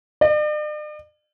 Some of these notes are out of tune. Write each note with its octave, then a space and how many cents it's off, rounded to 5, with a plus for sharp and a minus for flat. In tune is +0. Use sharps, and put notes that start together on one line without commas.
D5 +45